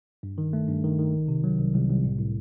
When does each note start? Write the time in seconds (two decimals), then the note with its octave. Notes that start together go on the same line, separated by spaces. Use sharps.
0.23 G2
0.38 D#3
0.53 A3
0.69 G2
0.84 D#3
0.99 D#3
1.13 C2
1.28 C3
1.44 F#3
1.59 C2
1.74 C2
1.89 C2
2.04 A2
2.18 A2